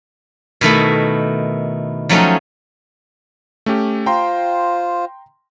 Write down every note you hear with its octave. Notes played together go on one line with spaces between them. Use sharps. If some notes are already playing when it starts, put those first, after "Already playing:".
B2 D#3 A3 E4
F3 F#3 A3 C#4 D#4
A3 C#4 G4
F4 C5 G5 A#5 C6